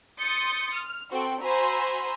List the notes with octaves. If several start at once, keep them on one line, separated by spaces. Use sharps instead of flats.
C6 D#6 G6 A6 C#7
F6
C4 F#4 A4 C5 G5
F#4 C5 G#5 A#5 B5 E6